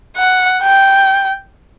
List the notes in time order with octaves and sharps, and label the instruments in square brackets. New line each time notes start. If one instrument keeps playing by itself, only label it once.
[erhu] F#5
G5